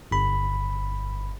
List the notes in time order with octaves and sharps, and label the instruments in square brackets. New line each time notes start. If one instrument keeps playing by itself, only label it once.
[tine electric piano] G1 B5